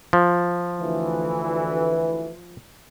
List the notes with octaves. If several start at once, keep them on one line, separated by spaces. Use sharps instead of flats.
F3
D2 E3